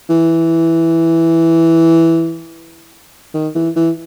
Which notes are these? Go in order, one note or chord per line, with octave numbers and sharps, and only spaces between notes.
E3
D#3
E3
E3